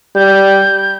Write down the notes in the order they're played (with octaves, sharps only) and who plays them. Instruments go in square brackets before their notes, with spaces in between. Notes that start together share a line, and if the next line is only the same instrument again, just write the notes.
[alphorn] G3 [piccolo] G6